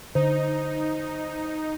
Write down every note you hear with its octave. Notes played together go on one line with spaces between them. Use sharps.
D3 D#4 C5